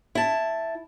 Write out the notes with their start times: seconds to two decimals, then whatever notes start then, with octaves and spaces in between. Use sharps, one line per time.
0.15 E4 A5